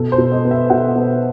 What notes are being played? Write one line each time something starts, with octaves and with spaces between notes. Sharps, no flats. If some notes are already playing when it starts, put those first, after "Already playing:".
Already playing: B2 A4
C5
B2
D#5
B3
E5
B2 F#5
B3